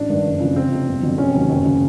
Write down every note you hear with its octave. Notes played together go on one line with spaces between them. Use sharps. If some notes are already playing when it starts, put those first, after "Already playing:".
Already playing: A1 D4
G2 D#3
F#1
F2 C#3 E3
F1 C4
F2 C3
G1
F2 D3 F#3
F1 C#4
D#2 D#3 F#3
F#1
C#3